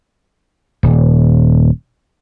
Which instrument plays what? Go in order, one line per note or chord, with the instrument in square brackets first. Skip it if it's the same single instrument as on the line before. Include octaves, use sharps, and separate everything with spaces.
[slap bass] D#1